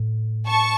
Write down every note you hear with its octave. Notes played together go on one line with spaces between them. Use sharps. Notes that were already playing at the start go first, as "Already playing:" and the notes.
Already playing: A2
A5 C#6